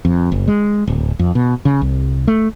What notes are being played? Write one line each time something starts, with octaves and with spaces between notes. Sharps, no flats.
F2
F#1
G#3
D1
F2
B2
C#3
C2
A3